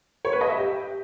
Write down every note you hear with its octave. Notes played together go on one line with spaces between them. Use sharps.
C#5
B4
D#5
E5
G4